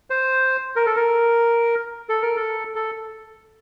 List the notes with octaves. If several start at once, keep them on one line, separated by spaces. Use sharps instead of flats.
C5
A#4
A4
A#4
A4
A#4
A4
A4